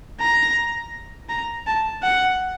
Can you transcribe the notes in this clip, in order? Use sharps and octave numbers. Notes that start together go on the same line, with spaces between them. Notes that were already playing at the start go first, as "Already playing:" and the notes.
A#5
A#5
A5
F#5